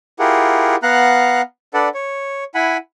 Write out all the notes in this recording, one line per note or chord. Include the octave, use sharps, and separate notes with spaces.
E4 F4 G4 G#4 A#4 F#5
B3 F5 F#5 A#5 F#6
D4 A4 B4 D5 F#5
C#5
E4 F#5 G#5 B5